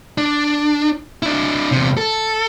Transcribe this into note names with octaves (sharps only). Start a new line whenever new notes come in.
D4
D4 E4
E2 C3
A4